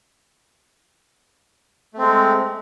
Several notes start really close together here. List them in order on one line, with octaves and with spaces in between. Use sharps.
A3 C4 G#3